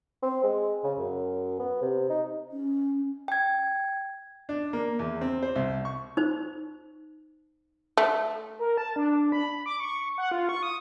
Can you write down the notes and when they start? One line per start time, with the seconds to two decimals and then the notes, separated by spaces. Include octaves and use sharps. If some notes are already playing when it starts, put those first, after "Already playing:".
0.23 C4
0.43 G#3
0.84 C#3
0.98 F#2
1.59 B3
1.82 C3
2.09 D#4
2.52 C#4
3.28 G5 G#6
4.49 D4
4.73 A#3
4.99 E2
5.21 C4
5.42 C5
5.56 C2
5.85 C#6
6.17 D#4 C5
7.97 A3
8.59 A#4
8.77 A5
8.96 D4
9.32 B5
9.66 D6
9.80 C#6
10.18 F#5
10.31 F4
10.49 C#6
10.63 D#6